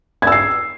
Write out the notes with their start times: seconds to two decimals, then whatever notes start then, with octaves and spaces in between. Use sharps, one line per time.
0.22 G#6
0.27 E6
0.32 C7